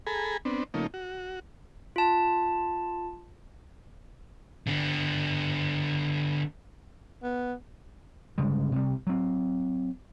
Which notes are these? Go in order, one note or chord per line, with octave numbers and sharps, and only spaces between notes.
G#4 A4 G#5 A#5 B5
B3 C4 D4
C#3 F3 A3 A#3 D#4
F#4
F4 A5
D3 B3
B3
G1 C#3 G3 G#3
C3 G3
F#3 C4